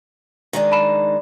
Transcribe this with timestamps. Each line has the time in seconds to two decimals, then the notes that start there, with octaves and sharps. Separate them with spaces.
0.53 D#3 G#3 D4
0.72 A5 B5 E7